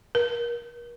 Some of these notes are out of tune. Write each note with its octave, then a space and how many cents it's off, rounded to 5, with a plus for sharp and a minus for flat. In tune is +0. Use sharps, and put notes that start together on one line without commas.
A#4 +35